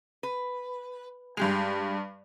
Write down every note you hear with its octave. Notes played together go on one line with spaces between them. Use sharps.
B4
G2 G#3 G4 F7